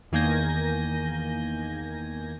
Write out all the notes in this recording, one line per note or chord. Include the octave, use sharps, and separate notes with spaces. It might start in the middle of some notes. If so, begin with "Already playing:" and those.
E2 D#3 A#3 G#5 G6 A#6